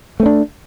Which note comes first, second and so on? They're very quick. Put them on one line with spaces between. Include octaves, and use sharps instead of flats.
A3 C4 D4